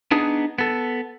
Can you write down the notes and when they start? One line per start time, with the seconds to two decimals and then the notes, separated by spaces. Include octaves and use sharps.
0.11 B3 D4 D#4 G#4
0.58 B3 A4